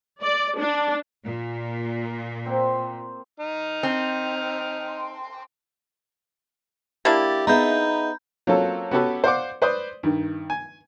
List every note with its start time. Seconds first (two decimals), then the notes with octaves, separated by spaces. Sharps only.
0.22 D5
0.58 D4
1.23 A#2
2.45 A#3 C4 C5
3.40 D#4 F6
3.83 C4
7.05 A#3 D4 E4 G4 A6
7.47 B3 D#4 G#4 E5 A#5 B5 G6
8.47 F#3 A#3 C4 C#4 F4 A4
8.91 B3 C#4 F#4 G4 A4 B4
9.24 C5 D5 F5 F#5 C6 D6
9.62 B4 C5 D5 C6 D#6
10.03 G2 D#3
10.50 G#5